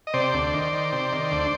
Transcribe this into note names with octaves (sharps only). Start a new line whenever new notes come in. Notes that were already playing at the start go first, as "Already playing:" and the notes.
D#5
C3 C5 D5
D2
D#3
D#3
C3
D#3
D2